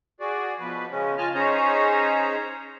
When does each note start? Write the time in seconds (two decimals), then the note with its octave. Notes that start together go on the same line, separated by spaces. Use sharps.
0.20 F#4 G#4 D5
0.59 B2 F3 B4
0.90 C#3 G#3 C#4
1.18 F4 D#5 G#5 A5 F6
1.35 C#4 D#4 G#4 C5 C#5 A#5